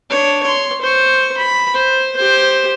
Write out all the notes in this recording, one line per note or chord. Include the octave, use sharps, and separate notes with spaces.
D4 C#5
C#5 C6
C5 C#6
B5
C5
G4 C5